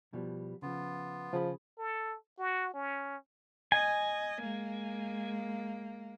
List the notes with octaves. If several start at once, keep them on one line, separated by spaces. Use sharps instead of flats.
B2 F3 G3
C#3 F3 B3 F4
C#3 F3 G#4 B5
A4
F#4
C#4
D#5 G#5
G#3 A#3